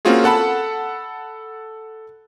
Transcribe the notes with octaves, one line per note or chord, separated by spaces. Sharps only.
A#3 C4 C#4 F4 F#4 G#4
A4 F#5 A5 B5